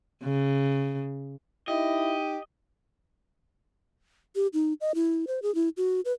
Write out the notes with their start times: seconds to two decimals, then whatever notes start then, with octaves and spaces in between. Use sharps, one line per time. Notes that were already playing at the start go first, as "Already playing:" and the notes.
0.24 C#3
1.68 D#4 E4 G4 D#5
4.36 G4
4.54 D#4
4.81 D#5
4.95 E4
5.27 C5
5.42 G#4
5.55 E4
5.77 F#4
6.05 B4